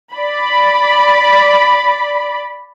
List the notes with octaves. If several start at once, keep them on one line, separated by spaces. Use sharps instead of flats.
D5 B5